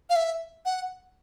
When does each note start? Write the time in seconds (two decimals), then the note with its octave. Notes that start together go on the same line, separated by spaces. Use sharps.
0.10 F5
0.16 E5
0.65 F#5